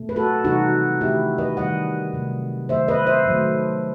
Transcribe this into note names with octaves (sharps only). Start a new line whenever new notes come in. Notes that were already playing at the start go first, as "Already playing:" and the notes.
Already playing: B2 A3
B4
F#4 A4
C3 E3 G3 D#4 F#4
D#3 A3 E4 G4
B4 D#5
D#3 G3 D#5 F#5
C3 F#3 A3
D#3 F#3 A3 C5 E5
B4 D#5
C5 E5
D#3 F#3 A3